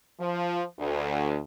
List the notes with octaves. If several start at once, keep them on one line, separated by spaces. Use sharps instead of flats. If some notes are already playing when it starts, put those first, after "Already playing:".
F3
D2